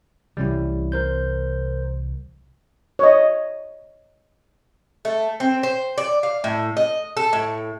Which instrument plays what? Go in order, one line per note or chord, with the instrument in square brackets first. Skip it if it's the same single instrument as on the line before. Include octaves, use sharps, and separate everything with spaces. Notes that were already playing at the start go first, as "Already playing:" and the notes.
[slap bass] C2 C3 E3 [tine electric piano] G3 C#4 E4
[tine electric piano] A#4 C5 G6
[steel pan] C#5 D#5
[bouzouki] A3
C4
C5
D5
F5
A2
D#5
A4
A2